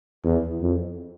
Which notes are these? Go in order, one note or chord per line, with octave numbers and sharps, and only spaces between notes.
E2
F2